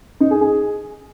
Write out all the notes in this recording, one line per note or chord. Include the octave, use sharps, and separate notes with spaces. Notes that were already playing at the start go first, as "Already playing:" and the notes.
D#4
G#4
G#4